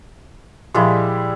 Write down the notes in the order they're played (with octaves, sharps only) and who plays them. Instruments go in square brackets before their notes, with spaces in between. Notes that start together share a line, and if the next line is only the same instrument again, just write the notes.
[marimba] A#2 F3 [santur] G3 G#3 E4